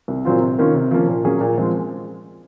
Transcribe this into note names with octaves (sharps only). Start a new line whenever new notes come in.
C2
A#2 F#3 C4 F4
C3
D#3 A#3 C#4 F4
C3
F3 A#3 C#4
A#2
F#3 A#3 C#4 G#4
A#2
F3 G#3 C4